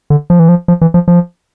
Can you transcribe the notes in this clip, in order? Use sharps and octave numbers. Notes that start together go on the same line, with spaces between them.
D3
F3
E3
F3
F3
E3
F3
F3